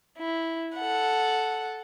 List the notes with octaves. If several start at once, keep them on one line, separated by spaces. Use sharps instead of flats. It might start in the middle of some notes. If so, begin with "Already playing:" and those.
E4
A4 F#5